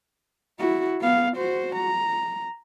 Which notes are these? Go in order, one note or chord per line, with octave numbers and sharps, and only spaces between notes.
E4 F#4
B3 F5
F#4 C5
A#5